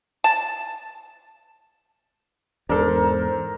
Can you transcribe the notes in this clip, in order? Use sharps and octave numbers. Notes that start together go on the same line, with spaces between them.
A5
E2 G#2 D4 A4 A#4 C5